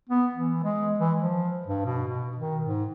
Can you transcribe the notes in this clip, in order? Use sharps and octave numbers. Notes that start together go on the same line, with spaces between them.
B3
E3
G#3
E3
F3
G2
B2
B2
D#3
G#2